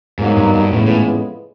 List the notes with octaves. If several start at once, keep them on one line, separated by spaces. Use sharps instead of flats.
G#2 B2 F#3 A#3 D#4
G2
G2
F2 A2 C#3 E3 G#3 B3
A2